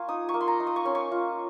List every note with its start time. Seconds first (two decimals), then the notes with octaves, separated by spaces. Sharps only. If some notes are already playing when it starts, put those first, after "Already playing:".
Already playing: A#3 F4 G#5 C#6
0.08 D#4 D#6
0.29 C#6
0.34 A#3
0.41 C6
0.47 A#5
0.60 D#4
0.67 D#6
0.76 C#6
0.85 C#4 C6
0.95 C#6
1.11 F4